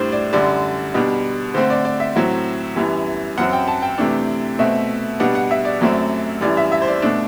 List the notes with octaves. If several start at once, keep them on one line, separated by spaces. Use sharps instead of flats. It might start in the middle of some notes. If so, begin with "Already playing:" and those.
Already playing: A2 G3 D4 C5 D5
D5
F#2 D3 G3 D5
B2 G3 D4
D3 A3 C4 C5
D5
D5
E5
A2 F#3 C4
F#2 E3 G3 B3
F#2 F#3 C4 F#5
G5
A5
G5
C3 E3 A3 D4
B2 A3 C4 E5
B2 G3 B3 D4 F#5
F#5
E5
D5
F#2 F#3 A3 C4
F#2 E3 G3 D5
E5
E5
C5
D5
B2 A3 D4